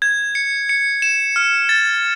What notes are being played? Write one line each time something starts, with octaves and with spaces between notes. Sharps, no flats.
G#6
C#7
C#7
E7
F6
A6